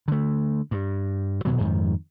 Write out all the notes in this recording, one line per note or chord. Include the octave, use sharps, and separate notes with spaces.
D3 A3
G2
D#1 B2 F#3
F2 G#2 D#3